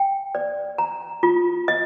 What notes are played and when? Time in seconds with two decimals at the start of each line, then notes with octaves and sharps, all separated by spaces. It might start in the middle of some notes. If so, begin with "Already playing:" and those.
Already playing: G5
0.35 D5
0.78 A#5
1.23 F4
1.68 D#5